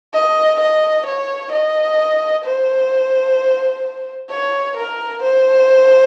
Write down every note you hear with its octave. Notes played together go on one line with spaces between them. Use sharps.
D#5
D#5
C#5
D#5
C5
C#5
A#4
C5